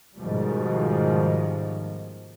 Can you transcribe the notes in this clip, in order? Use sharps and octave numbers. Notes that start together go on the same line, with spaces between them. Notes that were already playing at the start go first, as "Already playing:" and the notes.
G#2 B2 D#3 F3 G3